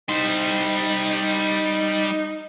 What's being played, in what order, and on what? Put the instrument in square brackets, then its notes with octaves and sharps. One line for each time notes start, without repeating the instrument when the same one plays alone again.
[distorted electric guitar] G3 C5 [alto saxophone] D#4